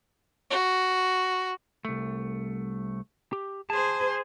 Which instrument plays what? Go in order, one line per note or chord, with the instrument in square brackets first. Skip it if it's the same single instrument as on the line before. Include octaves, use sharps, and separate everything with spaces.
[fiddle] F#4
[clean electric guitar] C2 A3
G4
[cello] G#4 C5 [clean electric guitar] A5